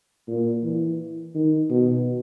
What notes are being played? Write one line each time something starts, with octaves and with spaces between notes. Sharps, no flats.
A#2
E3
D#3
B2